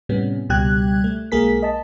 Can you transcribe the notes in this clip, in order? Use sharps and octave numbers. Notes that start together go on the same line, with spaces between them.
A2 C3 G3 B3 C#4
C#2 B2 G3 G4 F#6 G#6
A3
B1 G#3 A#3 G#4 A#4 B6
D#5 A5